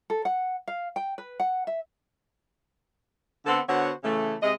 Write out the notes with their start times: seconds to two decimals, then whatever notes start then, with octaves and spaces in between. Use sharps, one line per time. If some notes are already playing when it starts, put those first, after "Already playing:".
0.10 A4
0.25 F#5
0.68 F5
0.96 G5
1.18 B4
1.40 F#5
1.67 E5
3.46 D3 B3 C4 A4
3.68 D3 B3 F#4 C5 C#5
4.04 C#3 E3 A3
4.42 C3 G#3 D#5